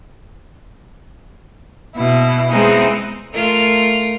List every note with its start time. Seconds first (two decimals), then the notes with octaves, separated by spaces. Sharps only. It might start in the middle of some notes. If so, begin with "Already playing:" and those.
1.94 B2 E4
2.49 G#3 B3 C4 D#4 E4 G#4
3.34 A3 F4 A#4